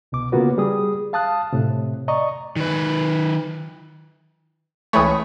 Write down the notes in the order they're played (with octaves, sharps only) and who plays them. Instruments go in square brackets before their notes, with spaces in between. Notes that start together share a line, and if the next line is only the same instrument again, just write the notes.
[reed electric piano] C2 B2 D6
C#3 A#3 B3 F4 F#4 B4
G3 G#4 D#6
F5 A5 D#6 F#6
A2 C3
D5 D#5 A#5 C#6
[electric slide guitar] D#3 B4
[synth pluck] C#2 E3 A3 [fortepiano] C#5 B5 D#6